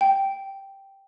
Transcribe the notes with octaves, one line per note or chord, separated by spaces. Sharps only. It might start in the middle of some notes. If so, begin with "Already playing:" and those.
G5